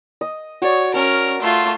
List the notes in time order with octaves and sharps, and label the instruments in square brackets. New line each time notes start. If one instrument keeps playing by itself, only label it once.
[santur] D#5
[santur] F#4 D5 [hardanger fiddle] C#5
[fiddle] C#4 F6 [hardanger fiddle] A#4 [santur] A#5
[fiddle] A3 F4 [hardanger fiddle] C6